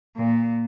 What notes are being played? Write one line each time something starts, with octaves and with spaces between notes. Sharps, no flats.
A#2